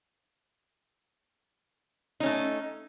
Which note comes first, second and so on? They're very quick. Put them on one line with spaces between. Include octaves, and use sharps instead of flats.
D#4 C#4 A3